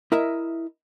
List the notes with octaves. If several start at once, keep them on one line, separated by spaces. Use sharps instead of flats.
E4 A#4 D#5 E5